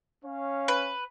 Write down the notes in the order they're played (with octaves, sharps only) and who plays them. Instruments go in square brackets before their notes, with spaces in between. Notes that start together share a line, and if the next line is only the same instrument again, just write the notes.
[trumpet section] C#4 C#5 F5
[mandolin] B4